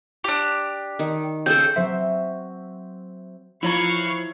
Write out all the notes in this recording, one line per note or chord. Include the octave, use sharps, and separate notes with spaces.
D4 G4
D#3
C#3 A4 C5 G5
F#3 C4 C5 E5
E3 F3 E4 C#5 F5 A#5 C#6